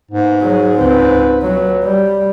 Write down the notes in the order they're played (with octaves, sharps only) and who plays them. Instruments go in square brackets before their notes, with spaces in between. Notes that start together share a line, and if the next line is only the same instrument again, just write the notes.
[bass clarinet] G#2 [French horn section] B2 A#3 B3
[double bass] F#3 [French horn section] G#4
[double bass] C#2 C4 [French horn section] B4
[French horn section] D2 A#2 B4 [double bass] F#3
[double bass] G3